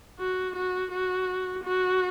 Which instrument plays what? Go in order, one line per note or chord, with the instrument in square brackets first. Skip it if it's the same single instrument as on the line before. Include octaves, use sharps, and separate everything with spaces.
[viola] F#4
F#4
F#4
F#4